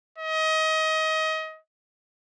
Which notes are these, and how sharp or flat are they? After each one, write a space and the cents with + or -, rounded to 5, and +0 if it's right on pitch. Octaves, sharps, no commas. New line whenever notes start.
D#5 +25